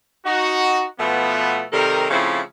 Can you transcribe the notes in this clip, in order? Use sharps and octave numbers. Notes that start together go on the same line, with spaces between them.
D#4 F#4
B2 F3 A3 B3
C3 D#3 G3 A4 A#4
C#3 F3 A3 C4 E4